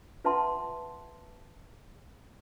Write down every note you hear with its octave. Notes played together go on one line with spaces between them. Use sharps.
F4 B4 E5 F#5 A5 C6